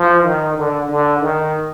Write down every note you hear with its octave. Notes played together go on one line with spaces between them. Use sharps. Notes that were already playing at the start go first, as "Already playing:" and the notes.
Already playing: F3
D#3
D3
D3
D#3